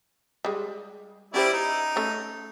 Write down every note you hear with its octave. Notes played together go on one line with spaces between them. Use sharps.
G3 G#3
G3 C#4 E4 G4 C5 D5
D#4
A3 C#4